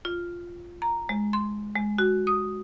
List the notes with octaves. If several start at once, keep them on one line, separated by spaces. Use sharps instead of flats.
F4
A#5
G#3
C6
G#3
F#4
D#6